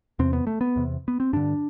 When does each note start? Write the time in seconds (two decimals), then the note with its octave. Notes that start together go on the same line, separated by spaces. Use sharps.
0.19 E2 C3 C4
0.33 B3
0.47 A3
0.61 B3
0.76 E2 C3
1.08 B3
1.20 C4
1.33 G2 D3 D4